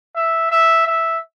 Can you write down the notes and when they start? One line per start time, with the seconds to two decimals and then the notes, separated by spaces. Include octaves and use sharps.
0.16 E5
0.52 E5
0.87 E5